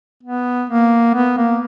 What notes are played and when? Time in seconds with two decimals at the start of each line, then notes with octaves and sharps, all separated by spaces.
0.23 B3
0.70 A#3
1.14 B3
1.37 A#3